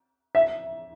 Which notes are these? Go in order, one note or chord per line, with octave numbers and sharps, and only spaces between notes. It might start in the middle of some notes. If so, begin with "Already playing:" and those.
E5